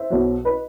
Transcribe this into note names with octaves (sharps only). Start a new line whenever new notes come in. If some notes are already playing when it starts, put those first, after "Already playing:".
Already playing: C5 E5
B1 B2 F#3
B4 D#5